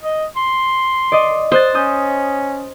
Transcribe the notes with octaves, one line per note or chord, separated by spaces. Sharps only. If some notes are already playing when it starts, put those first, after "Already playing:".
D#5
C6
D5 D#5
C5 D#6 F#6 A6
C#4 D#6 G6